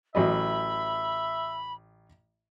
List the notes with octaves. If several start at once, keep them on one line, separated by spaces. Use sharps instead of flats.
A1 F#3 D#5 E5 B5